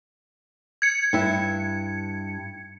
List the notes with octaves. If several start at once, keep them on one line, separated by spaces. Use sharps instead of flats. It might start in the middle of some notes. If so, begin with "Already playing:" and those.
G#6 C#7
G2 E4